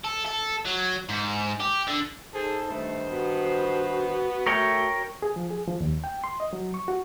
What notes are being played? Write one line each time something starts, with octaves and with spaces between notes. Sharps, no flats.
A4
A4
F#3
G#2
G4
D3
D#4 G#4 A4 C5
G2 D#3 A3 C5
B3 F#4
A3 A#4 C#5 G5
G#4
F3
G#4
F3
D#2
G5
C6
D#5
F#3
C#6
F#4